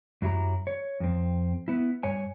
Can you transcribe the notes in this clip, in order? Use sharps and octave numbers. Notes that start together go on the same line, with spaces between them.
F#2 F#3 E4 F#4 G4 A#5
C#5
F2 C4
B3 E4
G2 C#5 G#5